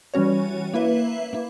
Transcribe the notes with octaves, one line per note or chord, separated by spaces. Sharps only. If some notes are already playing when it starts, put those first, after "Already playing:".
E3 G3 C#4 F#4 C#5
A#3 E4 B4 E5
A#3 E4